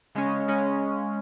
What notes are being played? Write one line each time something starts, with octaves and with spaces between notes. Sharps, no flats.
C#3 G#3 C#4
C#3 G#3 C#4